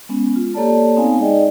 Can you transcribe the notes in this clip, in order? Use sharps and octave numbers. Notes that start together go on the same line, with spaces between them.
G#3 B3 C#4
F4
A#3 G4 A4 C#5 D5 A5
B3 C4 D#4 F5 G#5
G#3 D#4 G#4 D5 D#5 G5